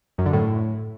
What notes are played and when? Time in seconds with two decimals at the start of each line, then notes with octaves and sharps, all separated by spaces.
0.18 F#2
0.26 D3
0.33 A2